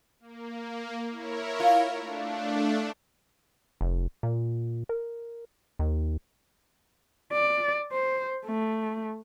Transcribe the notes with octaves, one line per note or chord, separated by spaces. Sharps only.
A#3
E4 A#4 C#5
F4
A3 D4
F1
A#2
A#4
D#2
D5
C5
A3